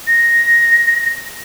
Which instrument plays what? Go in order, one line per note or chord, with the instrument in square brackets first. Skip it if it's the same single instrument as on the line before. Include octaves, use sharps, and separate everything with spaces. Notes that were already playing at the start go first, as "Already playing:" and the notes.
[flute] A#6